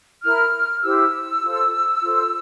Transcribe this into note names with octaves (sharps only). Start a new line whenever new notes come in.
E4 A#4 F6
E4 G4 C5 E6
F4 A4 C5
F4 A4 C5